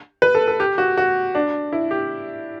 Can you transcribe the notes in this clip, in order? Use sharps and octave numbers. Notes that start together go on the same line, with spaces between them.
B4
A4
A4
G4
F#4
F#4
D4
E4
G4